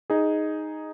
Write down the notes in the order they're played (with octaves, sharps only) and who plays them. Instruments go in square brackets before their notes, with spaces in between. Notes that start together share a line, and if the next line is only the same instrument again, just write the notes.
[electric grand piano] D#4 G#4